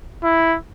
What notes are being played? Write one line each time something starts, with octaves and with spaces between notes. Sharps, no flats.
E4